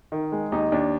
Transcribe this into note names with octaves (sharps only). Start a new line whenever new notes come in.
D#3
G#3
D#2 D#4
D#2 D4